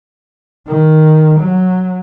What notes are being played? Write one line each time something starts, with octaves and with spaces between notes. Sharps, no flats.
D#3
F#3